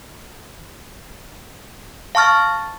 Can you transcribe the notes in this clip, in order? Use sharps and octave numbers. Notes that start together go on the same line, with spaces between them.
F5 A5 C#6 F6 A6